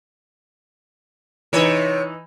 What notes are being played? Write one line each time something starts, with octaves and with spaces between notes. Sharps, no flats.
C3 E3 D#4 C#5